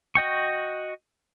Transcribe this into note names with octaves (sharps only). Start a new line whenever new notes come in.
F#4 D#5 G5 C#6